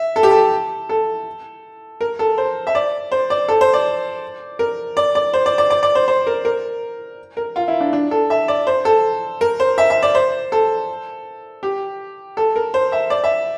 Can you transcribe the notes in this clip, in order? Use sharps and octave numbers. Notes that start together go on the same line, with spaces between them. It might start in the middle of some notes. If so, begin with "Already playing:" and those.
Already playing: E5
A4
G4
A4
A4
A#4
A4
C5
E5
D5
C5
D5
A4
C5
D5
A#4
D5
D5
C5
D5
D5
D5
D5
C5
C5
A#4
A#4
A#4
F4
E4
D4
D4
A4
E5
D5
C5
A4
A#4
C5
E5
E5
D5
C5
A4
G4
A4
A#4
C5
E5
D5
E5